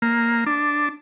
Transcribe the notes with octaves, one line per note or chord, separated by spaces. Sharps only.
A#3
D4